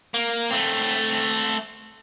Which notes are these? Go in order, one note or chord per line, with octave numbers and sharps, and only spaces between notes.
A#3
A3 C4